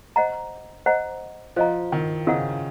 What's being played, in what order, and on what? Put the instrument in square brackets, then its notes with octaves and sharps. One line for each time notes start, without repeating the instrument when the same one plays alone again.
[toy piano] C5 D#5 F#5 A#5
C5 D#5 F#5 A#5
[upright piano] F3 [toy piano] C5 D#5 F#5 A#5
[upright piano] D#3
[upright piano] C#3 [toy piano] C5 D#5 F#5 A#5